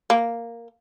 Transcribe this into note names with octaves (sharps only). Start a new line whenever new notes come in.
A#3